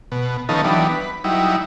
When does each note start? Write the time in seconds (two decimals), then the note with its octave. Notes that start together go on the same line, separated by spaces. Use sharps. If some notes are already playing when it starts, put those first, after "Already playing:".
0.12 B2
0.49 D#3 F3 B3 C#4 D#4 A4
0.64 E3 F#3 G3 B3 D4 D#4
0.89 B4
1.24 F#3 G3 D#4 E4